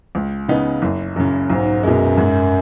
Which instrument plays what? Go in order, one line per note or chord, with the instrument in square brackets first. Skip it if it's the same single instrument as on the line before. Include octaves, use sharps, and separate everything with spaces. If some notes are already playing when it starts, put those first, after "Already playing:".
[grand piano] C#2
C#3 B3 D#4
F#1
F#2 C#3
[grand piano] B1 [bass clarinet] G#2
[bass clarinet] F#2 [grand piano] B2 G#3
[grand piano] G#2